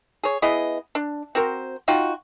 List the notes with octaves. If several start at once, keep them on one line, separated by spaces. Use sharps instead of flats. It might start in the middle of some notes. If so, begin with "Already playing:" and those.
G#4 C#5
B3 E4 G#4 D#5
D4
C4 F#4 A#4 C5
D#4 F4 F#4 G5